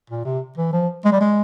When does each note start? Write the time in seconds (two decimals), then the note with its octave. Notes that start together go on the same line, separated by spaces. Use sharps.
0.10 A#2
0.25 C3
0.57 E3
0.73 F3
1.05 G#3
1.12 G3
1.21 G#3